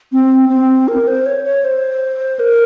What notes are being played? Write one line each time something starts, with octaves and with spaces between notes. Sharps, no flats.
C4
C4
A#4
C5
C#5
C#5
C5
A#4